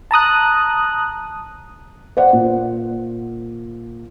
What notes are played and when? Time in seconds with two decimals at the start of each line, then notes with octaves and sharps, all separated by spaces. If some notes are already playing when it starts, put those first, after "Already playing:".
0.11 A5 A#5 D#6 F#6
2.17 C5 D5 F#5
2.33 A#2